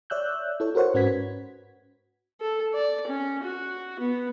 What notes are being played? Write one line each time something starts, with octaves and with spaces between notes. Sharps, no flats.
C#5 D5 E5 E6 F#6 G6
E4 A4 C#5
F#4 A#4 C5 C#5 F#5
G#2 C#4 F#4 B4 G#6 B6
A4
D5
C#4
F#4
B3